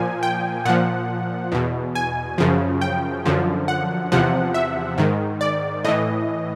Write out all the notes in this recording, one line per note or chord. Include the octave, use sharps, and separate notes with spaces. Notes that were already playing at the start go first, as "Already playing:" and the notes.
Already playing: A#2 F3 G#5
G5
A#2 F3 F#5
E2 B2
G#5
F#2 C#3 F3
G5
F#2 D3 F3
F#5
E2 C3 F3 F#5
E5
G#2 D#3
D5
A2 E3 D#5